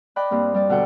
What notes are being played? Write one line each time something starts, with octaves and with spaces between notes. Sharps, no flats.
D5 D#5 G5 B5 F#6
G2 A#3 C4
G3 D5
B2 D3 A4 F#5 G5